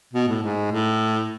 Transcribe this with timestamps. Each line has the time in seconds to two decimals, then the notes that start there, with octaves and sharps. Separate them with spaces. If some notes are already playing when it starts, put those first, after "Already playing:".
0.14 B2
0.28 A2
0.43 G#2
0.72 A2